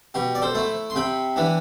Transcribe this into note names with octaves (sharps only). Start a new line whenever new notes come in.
B2 G4
D5
A4 C5
A3 E4
C6
C3 G5 B5
E3 B3 D4